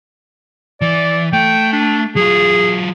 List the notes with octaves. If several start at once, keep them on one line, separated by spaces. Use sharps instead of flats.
E3 D5
A3 G5
D4
F#3 F4 G#4